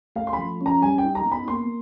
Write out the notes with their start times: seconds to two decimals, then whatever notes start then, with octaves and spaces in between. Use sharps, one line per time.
0.16 A3 F5
0.27 C6
0.33 B5
0.39 F3
0.61 C#4 A#5
0.82 G3 G#5
0.98 G5
1.04 D#4
1.15 A#5
1.26 B3
1.32 B5
1.48 A#3 C6